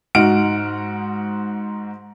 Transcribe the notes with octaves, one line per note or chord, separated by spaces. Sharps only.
G#2 D#4 F#4 F#5 F6 D7